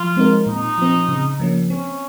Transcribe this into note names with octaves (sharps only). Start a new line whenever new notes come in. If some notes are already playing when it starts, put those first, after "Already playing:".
Already playing: F3 F4
G#3 C4 D#4 A#4
A#2 D#4
F3 C4
C#3
F3 A#3 C#4
C4 C#4